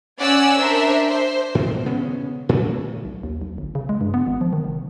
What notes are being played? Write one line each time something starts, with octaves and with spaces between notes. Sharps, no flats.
C#4 D5 F#5 G#5 E6
D4 A#4 C5 E5
C5
G#2 B2 D#3
E1 C#3 B3 C#4
A2 C#3 A3 A#3
B1
D#2
B1
G1
C#3
G#3
G2
B3
G#1
F3
D#3
F1